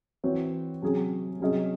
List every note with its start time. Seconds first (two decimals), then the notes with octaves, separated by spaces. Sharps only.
0.24 E3 C4 F#4 C#5
0.82 C3 F#3 C#4 G#4
1.40 C3 F#3 C#4 G#4 D#5